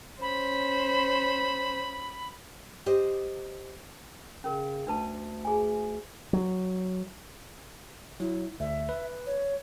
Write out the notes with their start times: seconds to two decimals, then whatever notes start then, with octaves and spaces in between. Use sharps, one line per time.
0.22 C#4 C5 B5
2.86 G4 C5 D#5
4.44 C#3 C#4 A#4
4.87 D2 D4 B4 A5
5.45 G#4 G#5
6.33 F#3
8.20 F#3 E4
8.60 D2 E5
8.89 B4
9.26 C#5